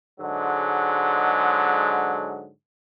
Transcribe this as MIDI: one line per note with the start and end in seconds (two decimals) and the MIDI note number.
0.20 2.50 44
0.20 2.50 50
0.20 2.50 54
0.20 2.50 56